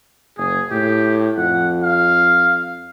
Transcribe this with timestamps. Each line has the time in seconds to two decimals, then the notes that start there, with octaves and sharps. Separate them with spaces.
0.38 F#1 G#4
0.71 A2 G4
1.38 F2 F#5
1.83 F5